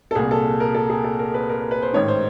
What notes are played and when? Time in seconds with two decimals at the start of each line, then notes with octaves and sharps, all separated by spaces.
0.11 A4
0.15 C2 A#2 G#4
0.31 A4
0.60 A#4
0.74 A4
0.90 G#4
1.04 A4
1.19 A#4
1.34 B4
1.49 A#4
1.71 B4
1.82 C5
1.93 A1 G#2 D#3 C#5
2.08 C5